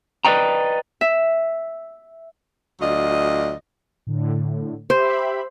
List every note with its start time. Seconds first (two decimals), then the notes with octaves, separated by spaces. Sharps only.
0.25 B4 C5 D5 D#5 G5 A#5
1.01 E5
2.79 D2 F#3 F4 D5 D#5
4.07 A2 D3
4.90 G4 C5 E5 B5